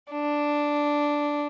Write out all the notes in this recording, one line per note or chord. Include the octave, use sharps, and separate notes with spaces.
D4